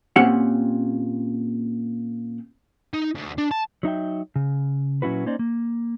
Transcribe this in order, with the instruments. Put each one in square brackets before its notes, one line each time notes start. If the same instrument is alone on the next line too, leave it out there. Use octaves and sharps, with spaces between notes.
[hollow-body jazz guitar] A#2 C4 C#4 G4 F#5
[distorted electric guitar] D#4
D2
D4
A5
[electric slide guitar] F#3 D#4 E5 G5
C#3
A#2 F#3 C#4 E4 F#4 B4
A#3 C#4 D#4 C5 D5
A#3